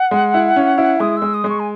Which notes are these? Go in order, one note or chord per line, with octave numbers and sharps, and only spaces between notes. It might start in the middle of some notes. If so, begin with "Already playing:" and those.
Already playing: F#5
G#3
E4
C#4
E4
G#3 D#6
G#3 E6
D#6
G#3
C#6
G#5